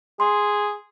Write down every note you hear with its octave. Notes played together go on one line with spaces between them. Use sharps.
G#4 C6